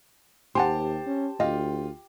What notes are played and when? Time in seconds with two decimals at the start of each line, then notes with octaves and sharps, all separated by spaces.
0.55 D#2 G4 C5 F#5 G#5 A5 C6
1.07 C#4
1.40 D2 F4 G4 D#5 F5